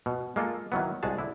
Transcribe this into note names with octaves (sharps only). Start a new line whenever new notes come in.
B2
G#3 A#3 F4 A4
D#3 E3 F#3 B3
C2 G#3 F#4 G#4 A5
D3 E4